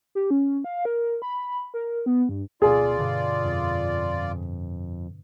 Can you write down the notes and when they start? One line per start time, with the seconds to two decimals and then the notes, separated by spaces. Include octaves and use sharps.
0.15 G4
0.31 C#4
0.64 F5
0.85 A#4
1.22 B5
1.74 A#4
2.06 B3
2.29 G2
2.62 D1 B2 F4 G#4 D5
2.99 G2 B2 D3
3.45 F2